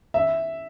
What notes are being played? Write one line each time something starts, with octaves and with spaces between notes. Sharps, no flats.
E5